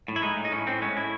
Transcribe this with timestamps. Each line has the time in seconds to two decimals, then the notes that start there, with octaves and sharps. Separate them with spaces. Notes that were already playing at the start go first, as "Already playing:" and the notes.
0.08 A2
0.16 E4
0.22 G#3 D#4
0.37 A2
0.45 D#4
0.51 A2 C#4
0.67 A2 C4
0.82 G#3 C#4
0.96 A2 E4